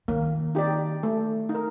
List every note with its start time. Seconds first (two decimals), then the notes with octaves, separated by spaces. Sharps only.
0.08 D#3 A#3
0.55 D#4 G4 D5
1.03 A3
1.49 D#4
1.55 A#4